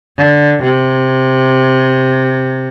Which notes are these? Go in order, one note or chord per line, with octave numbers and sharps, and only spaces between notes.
D3
C3